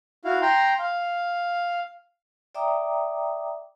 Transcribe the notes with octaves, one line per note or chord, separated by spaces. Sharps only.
E4 F#4 F5
G5 A#5 C6
F5
D5 E5 G5 A#5 D6 D#6